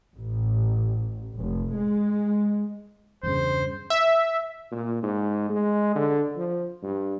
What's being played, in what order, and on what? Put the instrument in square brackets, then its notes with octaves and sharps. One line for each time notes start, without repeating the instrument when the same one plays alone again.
[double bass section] A1
F1
G#3
[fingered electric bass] E2 G2 C#3 [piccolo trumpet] C5
[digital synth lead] E5
[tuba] A#2
G#2
G#3
D3
F3
G2